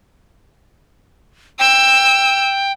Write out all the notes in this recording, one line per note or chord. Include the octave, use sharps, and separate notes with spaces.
G5 E6